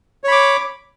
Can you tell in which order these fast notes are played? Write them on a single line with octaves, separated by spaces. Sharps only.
C#5 B5 D6